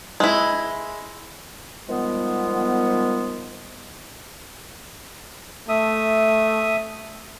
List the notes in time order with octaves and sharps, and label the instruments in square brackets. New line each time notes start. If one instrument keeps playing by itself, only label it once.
[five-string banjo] G#3 E4
[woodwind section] D#3 F3 G3 G#3 B3
[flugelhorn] A3 [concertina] E5 D#6